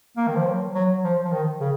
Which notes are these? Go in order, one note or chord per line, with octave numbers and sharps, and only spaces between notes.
A#3
D#3
F3
F#3
F#3
F3
F3
D#3
C#3